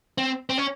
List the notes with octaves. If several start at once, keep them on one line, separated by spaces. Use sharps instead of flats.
C4
C4
C#4